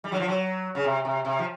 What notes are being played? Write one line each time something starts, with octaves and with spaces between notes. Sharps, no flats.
G3
F#3
F3
F#3
C#3
C3
C3
C3
F3